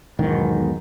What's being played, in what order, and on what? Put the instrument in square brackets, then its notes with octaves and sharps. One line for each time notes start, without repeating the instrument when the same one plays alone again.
[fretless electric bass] E1 B1 G#2 D#3